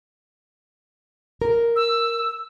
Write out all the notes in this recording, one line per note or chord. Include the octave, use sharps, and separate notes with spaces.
A#4
E6